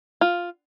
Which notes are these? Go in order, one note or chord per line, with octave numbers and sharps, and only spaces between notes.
F4